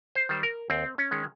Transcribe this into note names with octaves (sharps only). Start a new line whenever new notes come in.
C5
D#3 G3
A#4
D#2 C4
C#4
D#3 G#3